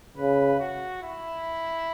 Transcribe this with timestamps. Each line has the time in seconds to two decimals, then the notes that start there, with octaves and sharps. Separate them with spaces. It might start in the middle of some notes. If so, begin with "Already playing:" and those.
0.17 C#3 B4
0.60 F#4
1.02 E4